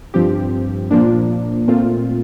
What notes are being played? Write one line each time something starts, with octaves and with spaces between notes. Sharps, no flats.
G2 F3 C4 G4
A#2 F3 A#3 D4
A#2 A3 C4 F4